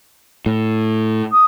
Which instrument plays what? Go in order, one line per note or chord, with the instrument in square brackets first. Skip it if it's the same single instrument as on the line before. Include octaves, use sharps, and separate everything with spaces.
[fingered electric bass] A2
[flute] D#6